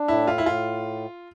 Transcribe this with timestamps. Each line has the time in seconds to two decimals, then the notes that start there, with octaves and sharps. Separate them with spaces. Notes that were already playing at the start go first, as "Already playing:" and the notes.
Already playing: D4
0.08 A2 E4
0.27 F4
0.38 E4
0.46 A2 F4